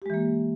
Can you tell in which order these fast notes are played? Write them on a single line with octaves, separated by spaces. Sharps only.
G4 G#3 E3 A#3